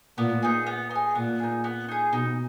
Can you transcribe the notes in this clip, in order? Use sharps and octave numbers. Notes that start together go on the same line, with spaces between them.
A#2 B3
D#4 G#4
B3
D#4 G#4
A#2 B3
D#4 G#4
B3
D#4 G#4
B2 D#4